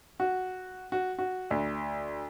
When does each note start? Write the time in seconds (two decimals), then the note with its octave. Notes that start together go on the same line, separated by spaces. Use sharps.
0.20 F#4
0.92 F#4
1.19 F#4
1.51 D2